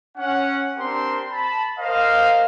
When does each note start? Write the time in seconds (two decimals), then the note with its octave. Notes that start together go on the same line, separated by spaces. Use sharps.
0.17 C#4 F#5
0.77 C4 D4 G4 A#4 C5 C6
1.31 A5 B5
1.79 A#4 C5 D#5 F5